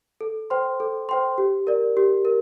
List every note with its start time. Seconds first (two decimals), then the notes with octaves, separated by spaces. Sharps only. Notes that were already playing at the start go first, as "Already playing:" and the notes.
0.21 A4
0.50 C5 G5 C6
0.80 A4
1.09 C5 G5 C6
1.38 G4
1.67 A#4 D5
1.97 G4
2.25 A#4